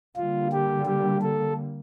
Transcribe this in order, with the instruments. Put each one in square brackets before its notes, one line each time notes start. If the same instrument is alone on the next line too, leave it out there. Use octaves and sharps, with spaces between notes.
[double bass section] D3 G3 A#3 [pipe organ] F4
[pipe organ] G4
G4
A4